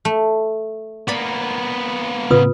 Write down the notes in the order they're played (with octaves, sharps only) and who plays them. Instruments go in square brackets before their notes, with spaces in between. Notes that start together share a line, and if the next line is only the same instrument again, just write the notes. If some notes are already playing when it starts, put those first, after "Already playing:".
[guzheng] A3
[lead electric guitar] A#3 B3 [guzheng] D5 B5
[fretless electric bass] A2 C#3 C4 [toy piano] F4 B4 D#6